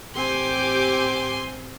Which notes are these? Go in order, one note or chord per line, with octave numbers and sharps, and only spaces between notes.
A1 C4 G4 C5 G#5 C6 D6